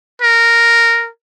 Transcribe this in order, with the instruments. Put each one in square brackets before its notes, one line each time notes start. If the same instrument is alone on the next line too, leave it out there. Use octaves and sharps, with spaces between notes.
[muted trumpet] A#4